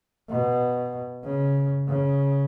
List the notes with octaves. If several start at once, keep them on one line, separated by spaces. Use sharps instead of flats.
B2
C#3
C#3